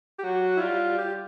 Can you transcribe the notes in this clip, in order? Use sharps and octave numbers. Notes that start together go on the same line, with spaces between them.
G4
F#3 F#4
E4
G3 F4
G4